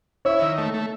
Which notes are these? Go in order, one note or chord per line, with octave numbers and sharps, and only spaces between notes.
E4 C#5 E5
D#3
A3
A3